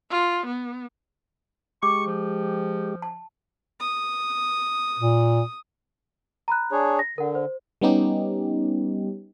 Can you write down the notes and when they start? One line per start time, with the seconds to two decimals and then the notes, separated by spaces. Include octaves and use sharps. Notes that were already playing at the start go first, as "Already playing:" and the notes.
0.10 F4
0.46 B3
1.83 G#3 G4 C#6 D6
2.07 F3
3.02 A5
3.80 D#6
4.99 A#2
6.48 A#5 B5 F#6
6.72 D4 G#4 C#5
6.99 A#6
7.18 D3 A#4 F#5
7.35 C5
7.81 G3 B3 C#4 D#4 G4